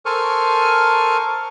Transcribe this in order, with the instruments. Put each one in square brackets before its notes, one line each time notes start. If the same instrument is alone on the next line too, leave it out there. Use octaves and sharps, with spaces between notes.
[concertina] A4 A#4 C5 G#5 C#6 F6